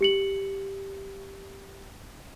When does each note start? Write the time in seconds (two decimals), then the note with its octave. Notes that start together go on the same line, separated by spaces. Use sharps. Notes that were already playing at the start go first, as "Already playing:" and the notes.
0.01 G4 C#7 F#7